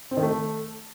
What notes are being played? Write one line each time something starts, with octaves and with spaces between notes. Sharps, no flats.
C4
D#3
A3